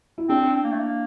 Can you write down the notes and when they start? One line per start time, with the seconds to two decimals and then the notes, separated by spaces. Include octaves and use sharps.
0.18 E4
0.29 C4 D4
0.55 C4
0.64 A#3
0.71 A3
0.79 A#3